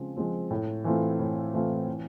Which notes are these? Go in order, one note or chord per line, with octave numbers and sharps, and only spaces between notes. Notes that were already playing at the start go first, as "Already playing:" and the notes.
Already playing: C#3 F3 G#3 C4
F3 G#3 C4
A2
E3 A3 C4 F4
A2
E3 A3 C4 F4
E3